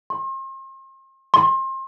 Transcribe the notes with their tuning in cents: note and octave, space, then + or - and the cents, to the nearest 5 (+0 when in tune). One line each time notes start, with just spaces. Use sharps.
C6 +40
C6 +30